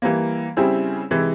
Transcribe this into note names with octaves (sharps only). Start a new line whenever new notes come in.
E3 G3 A#3
C#3 G3 C4 E4 G#4
C3 E3 G#3 E4